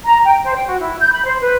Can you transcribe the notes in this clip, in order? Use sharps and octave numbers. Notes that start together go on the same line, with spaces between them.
A#5
G5
C5
G5
F#4
E4
G6
B5
C5
B4